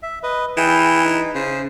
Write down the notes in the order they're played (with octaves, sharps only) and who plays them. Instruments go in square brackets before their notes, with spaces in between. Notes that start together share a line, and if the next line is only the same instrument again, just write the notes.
[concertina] E5
B4 D#5
[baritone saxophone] E3 [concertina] E4 G#4 G5
[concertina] D#4
[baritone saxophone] C#3 [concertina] C5